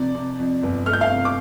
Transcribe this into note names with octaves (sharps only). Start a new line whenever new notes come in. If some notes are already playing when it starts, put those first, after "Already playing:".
Already playing: F2 C3 D5
C3
F2
G1
A3 F6
G6
F5 F6
C3
D6